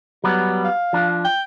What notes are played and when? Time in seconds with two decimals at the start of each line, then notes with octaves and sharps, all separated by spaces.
0.24 F#3 G3 B3
0.64 F5
0.93 F3 D4
1.25 G5